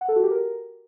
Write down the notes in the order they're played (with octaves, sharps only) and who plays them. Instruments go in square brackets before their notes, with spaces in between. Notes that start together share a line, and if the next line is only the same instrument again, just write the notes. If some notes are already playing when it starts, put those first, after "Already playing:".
[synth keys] F#5
A4
F#4
G4
A#4